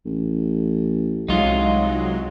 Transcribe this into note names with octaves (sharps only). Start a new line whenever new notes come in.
A1
C2 F#3 G#3 D#4 F4